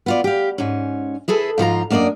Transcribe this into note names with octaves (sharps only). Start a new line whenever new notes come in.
B3 F4 D5
G4 F5
G#2 C#4
E4 G#4 A4 B4
G#2 F3 F4 A#5
F#2 A#3 D4 D5 D#5